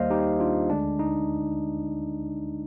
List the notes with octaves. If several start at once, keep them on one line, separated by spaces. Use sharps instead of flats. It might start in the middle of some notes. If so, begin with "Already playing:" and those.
Already playing: D#2 D#3 G3 A#3 C5 D#5 F5
D#4 G4
D4 F4
D2 D3 G#3 D4
D#4